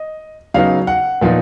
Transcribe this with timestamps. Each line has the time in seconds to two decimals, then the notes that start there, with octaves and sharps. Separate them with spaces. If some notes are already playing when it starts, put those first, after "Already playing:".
Already playing: D#5
0.54 C#3 F#3 B3 D#4 F5
0.87 F#5
1.21 A#2 F3 B3 D#4